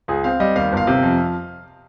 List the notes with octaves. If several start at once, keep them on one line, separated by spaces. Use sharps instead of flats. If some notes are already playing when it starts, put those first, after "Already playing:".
C#2 G#4
C4 F5
G3 D#5
D#2 F5
G1 F5
C3
F2